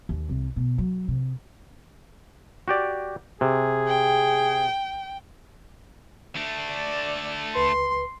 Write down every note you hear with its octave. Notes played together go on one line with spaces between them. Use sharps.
D#2
C2
B2
F#3
C3
F#4 G4 D5
C3 G#4
G5
A3 D4
D5
C#2 B4 C6